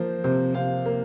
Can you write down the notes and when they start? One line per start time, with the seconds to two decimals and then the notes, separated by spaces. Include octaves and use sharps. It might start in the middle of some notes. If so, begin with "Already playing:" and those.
Already playing: F3 A#3 C5
0.24 C3 C5
0.54 C3 C5 F5
0.85 A#3